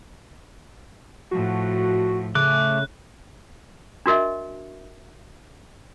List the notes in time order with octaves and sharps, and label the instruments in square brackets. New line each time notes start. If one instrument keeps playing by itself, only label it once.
[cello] A2 F3 [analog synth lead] F#4
[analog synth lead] C#3 [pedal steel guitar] A3 D6 [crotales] F#6
[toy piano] D4 F#4 A#4 D#5 E5